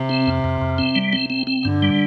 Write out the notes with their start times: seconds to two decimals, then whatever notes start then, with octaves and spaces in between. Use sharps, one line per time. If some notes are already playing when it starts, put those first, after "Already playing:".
Already playing: C3
0.09 C4
0.27 F2
0.44 F2
0.61 F2
0.78 C4
0.95 G3
1.13 C4
1.30 C4
1.47 C4
1.65 G2 D3
1.82 G3